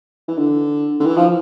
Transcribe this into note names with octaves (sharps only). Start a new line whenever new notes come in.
E3
D3
D3
E3
F3